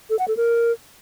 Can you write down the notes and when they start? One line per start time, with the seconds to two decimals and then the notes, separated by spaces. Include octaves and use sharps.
0.10 A4
0.19 F#5
0.28 A4
0.37 A#4